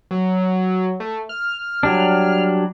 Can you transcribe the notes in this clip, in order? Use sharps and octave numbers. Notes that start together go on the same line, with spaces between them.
F#3
A3
F6
F#3 G3 D4